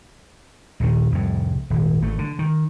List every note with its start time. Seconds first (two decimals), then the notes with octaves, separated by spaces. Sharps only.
0.80 A#1 D#2 D#3
1.12 C2 F2 A2
1.70 D#1 G#1
2.02 G#1 A3
2.18 D3
2.39 D#3